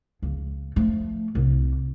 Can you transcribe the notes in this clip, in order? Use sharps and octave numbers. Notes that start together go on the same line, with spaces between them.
C#2
F3 A3
C2